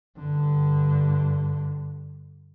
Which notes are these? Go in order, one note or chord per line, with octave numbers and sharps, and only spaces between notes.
G2 D3